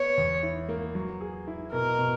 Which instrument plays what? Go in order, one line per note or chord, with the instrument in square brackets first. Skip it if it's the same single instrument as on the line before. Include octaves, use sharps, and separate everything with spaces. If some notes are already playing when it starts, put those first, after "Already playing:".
Already playing: [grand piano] B3 [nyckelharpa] C#5
[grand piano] E2
E4
A#3
F#3
G#4
E4
[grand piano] B2 [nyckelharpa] A#4
[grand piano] B2